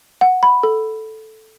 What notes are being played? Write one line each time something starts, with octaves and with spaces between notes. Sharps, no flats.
F#5
B5
A4